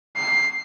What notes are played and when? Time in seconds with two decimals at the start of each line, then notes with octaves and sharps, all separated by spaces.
0.17 C7